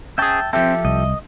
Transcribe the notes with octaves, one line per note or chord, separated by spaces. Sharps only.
C#4 G#4 E5 G5 A5
F3 C4 G4 A4 E5 G5
C2 D#5